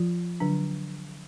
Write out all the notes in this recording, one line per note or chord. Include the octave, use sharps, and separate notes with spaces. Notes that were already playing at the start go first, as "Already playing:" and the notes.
Already playing: F3 F4
D3 F#3 D4